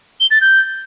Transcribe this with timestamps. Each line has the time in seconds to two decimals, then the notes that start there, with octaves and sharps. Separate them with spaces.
0.20 G7
0.31 A6
0.41 G6